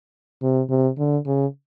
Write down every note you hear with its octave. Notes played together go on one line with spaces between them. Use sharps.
C3
C3
D3
C#3